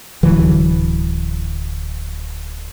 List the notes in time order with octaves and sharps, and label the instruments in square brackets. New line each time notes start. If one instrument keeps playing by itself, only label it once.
[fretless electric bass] D1 D3 E3 F#3